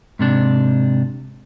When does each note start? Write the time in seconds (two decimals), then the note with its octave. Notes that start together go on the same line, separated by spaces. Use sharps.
0.19 G#2 C3 D4